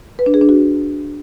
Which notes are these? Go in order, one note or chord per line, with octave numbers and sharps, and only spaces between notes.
B4
D4
G#4
D4
F#4